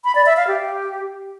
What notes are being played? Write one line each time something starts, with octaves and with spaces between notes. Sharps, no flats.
B5
D5
E5
F5
G4